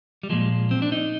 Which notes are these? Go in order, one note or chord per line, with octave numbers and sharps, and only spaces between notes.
G3
A#2 F3 G#3
C4
D4
D#4